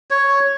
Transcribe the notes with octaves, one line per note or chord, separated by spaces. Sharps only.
C#5